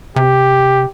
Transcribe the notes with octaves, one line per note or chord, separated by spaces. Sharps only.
C3 G4